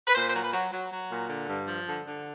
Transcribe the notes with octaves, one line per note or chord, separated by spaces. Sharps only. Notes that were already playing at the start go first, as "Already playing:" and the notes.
B4
A#2 C5
C5
F#3
B4
F#3
F#3
F#3
A#2
D3
G2
F3
D3
D3